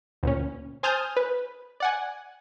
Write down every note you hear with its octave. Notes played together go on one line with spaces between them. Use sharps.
D2 A#2 C#4
C5 G#5 A5 D#6 F6 G6
B4
D5 F#5 G#5